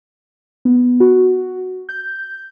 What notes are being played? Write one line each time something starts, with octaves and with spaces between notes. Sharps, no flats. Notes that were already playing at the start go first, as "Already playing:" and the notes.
B3
F#4
G6